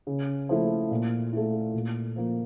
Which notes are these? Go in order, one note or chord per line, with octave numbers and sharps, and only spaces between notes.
C#3
F3 A3 E4
A#2
A3 E4
A#2
F3 A#3